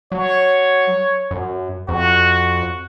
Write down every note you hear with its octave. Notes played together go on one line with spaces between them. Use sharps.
F#3 C#5
F#2
F2 F#4